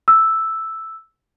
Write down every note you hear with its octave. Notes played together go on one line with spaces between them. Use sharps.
E6